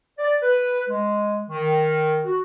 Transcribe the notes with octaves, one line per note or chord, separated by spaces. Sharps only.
D5
B4
G#3
D#3
F#4